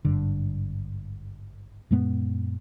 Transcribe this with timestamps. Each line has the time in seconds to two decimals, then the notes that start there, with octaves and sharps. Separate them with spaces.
0.05 G#1 G2 D3
1.91 F#2 A#2 G#3 B3